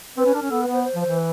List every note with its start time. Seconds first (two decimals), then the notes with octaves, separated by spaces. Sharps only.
0.17 C4 B4
0.25 C#4
0.33 D4 A#4
0.42 C#4
0.50 B3 A4
0.61 B4
0.67 B3
0.73 C5
0.84 C5
0.95 F3
1.00 C5
1.06 E3
1.17 B4